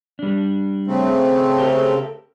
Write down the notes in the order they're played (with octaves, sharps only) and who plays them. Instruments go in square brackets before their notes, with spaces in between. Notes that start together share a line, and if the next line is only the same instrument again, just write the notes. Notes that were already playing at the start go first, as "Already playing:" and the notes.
[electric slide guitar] G3 D4
[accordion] C#3 A3 C4
[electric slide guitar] G4 A4 A#4